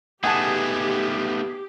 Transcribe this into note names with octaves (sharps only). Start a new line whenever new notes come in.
A3 B3 D#4 G4 G#4 F#5 G#5 A5